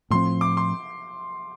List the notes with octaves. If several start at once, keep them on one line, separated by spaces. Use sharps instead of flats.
A2 F3 C4 C6
D6
C6